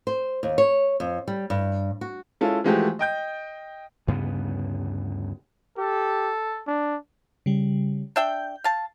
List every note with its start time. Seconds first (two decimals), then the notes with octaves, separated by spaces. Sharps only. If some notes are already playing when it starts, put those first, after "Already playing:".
0.07 C5
0.43 D#2
0.58 C#5
1.00 F2
1.28 G3
1.50 G2
2.01 F#4
2.41 G#3 C#4 E4 F4 A4
2.64 E3 F3 G#3 A3 F#4 G4
2.99 D#5 G5 G6
4.07 D2 G2 C#3 B3
5.78 G4 A4
6.67 D4
7.46 C#3 G3
8.16 D4 E5 G5 G6
8.64 F5 A5